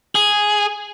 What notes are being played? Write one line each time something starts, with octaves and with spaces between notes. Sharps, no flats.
G#4